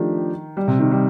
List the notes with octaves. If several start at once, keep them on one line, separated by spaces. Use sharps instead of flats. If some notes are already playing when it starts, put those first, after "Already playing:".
Already playing: D#3 F3 A3 D4 G4
G3
C3
D#3
G3